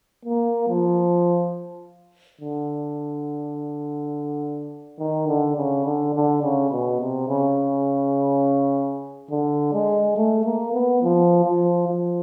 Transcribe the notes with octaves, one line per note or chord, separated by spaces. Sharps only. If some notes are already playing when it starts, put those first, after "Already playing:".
A#3
F3
D3
D#3
D3
C#3
D3
D3
C#3
B2
C3
C#3
D3
G#3
A3
A#3
B3
F3
F3
F3